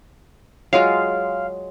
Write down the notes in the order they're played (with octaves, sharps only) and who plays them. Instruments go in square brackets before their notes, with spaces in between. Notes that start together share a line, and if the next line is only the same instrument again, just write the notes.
[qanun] F#3 G#3 F4 [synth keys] F5